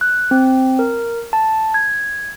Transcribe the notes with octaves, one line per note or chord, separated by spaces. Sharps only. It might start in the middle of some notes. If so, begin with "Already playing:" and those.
F#6
C4
A#4
A5
G#6